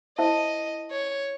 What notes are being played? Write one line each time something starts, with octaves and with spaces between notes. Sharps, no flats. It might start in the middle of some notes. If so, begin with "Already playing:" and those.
E4 C5 D#5 E5 A5
C#5